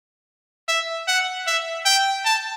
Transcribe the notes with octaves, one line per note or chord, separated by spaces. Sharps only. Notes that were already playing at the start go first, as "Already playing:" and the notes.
E5
F#5
E5
G5
A5